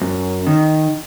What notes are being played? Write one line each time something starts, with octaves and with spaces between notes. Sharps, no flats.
F#2
D#3